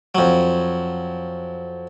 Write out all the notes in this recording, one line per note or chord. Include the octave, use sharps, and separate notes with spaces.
F2 F#3